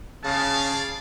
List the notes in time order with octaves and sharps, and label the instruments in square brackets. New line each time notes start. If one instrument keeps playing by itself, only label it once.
[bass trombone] C#3 [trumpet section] G#4 D5 F5 [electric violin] A5